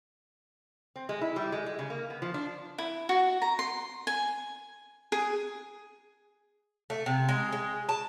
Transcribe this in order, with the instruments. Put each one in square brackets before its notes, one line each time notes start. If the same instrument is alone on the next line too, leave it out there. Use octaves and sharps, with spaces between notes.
[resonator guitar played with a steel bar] C4
G#3
E4
G3
G#3
G#3
C#3
A#3
B3
F3
D4
[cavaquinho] E4
F#4
A#5
C6
G#5
G#4
[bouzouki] A3
C3
G#3
G#3
A5